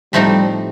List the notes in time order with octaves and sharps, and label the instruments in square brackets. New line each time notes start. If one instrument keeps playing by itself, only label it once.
[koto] A2 F3 A3 C4 D#4 [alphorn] G3